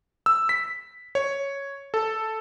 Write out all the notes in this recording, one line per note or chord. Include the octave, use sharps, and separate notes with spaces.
E6
B6
C#5
A4